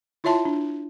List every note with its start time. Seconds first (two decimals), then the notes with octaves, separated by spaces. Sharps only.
0.24 E4 F4 C#5 E5 A5 C6
0.45 D4